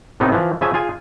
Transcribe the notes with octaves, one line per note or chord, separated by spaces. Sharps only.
A2 C3 B3 D#4
E3 F3
C#3 F3 E5 G#5
F4 G#4 G#5